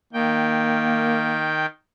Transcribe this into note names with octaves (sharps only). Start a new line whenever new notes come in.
D#3 A#3 G5